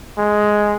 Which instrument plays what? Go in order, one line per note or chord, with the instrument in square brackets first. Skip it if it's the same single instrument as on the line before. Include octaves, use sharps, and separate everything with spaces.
[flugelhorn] G#3